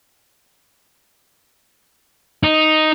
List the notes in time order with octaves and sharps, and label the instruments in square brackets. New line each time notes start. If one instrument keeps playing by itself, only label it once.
[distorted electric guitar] D#4